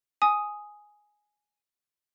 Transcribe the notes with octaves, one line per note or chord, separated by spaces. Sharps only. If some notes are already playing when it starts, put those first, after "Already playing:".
G#5 D#6